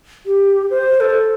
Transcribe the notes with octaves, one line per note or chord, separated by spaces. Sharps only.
G4
C5
A4